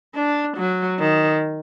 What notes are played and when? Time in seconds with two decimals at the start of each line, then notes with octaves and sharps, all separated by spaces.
0.15 D4
0.57 F#3
0.99 D#3